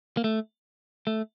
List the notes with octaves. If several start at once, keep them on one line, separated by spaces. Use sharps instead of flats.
A#3
A3
A3